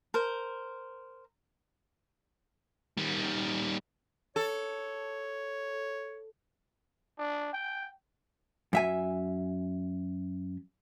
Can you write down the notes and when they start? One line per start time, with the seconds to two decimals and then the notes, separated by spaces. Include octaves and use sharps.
0.14 A#4 C5
2.98 D#3 G3
4.36 A4 C#5
7.18 D4
7.53 G5
8.73 F#2 E5 G#5